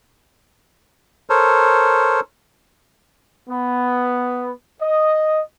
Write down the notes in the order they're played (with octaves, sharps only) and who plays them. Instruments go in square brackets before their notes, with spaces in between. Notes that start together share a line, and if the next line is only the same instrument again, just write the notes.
[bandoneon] A4 A#4 C5 C#5
[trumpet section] B3
D#5